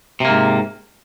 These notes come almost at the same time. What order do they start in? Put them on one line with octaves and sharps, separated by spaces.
C3 A#3 G#2